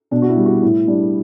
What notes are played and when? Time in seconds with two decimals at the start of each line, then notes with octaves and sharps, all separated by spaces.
0.11 B2 D4
0.22 F#4
0.29 E4
0.37 G3
0.46 F#4
0.62 A2 E4
0.87 G3 D4